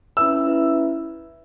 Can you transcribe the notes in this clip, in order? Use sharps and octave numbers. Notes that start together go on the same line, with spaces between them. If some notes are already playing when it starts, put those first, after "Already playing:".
C#4 E4 B4 E5 E6
C#4 E4 B4 E5